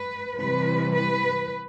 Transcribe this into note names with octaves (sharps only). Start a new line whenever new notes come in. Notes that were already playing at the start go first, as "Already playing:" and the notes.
Already playing: B4
C3 E3 G3 B4
B4